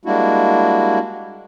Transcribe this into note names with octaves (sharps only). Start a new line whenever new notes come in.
G3 G#3 A#3 D4 E4 F#4